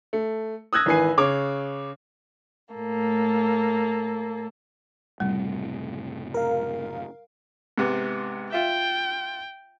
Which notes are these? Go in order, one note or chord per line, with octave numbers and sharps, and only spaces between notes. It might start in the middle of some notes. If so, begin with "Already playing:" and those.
A3
D#6 E6 F#6 G#6 A#6
G#1 E3 B4 G#5 C7
C#3 C#5 D6
A2 A#3 A4
F#1 A2 C3 G3
A#4 F5
G#2 C3 B3
F4 E5 G5